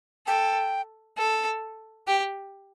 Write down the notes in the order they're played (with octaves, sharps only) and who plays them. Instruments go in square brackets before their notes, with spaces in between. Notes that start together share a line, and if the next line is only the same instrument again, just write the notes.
[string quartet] A4 [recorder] G5
[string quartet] A4
[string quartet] G4 [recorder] G5